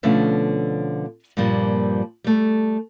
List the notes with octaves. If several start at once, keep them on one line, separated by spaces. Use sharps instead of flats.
B2 D3 F3 A3 B3 C#4
G2 A#2 F3 G3 A#3
G3 A3